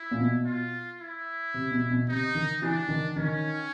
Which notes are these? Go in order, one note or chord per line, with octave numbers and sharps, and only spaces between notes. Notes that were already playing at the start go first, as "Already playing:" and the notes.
Already playing: E4
A#2
B2
F4
E4
C3
B2
B2
C3 D#4
D#3
E3 D4
D#3
D#3 C#4